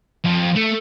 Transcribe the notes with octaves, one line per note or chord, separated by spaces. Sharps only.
F2
A3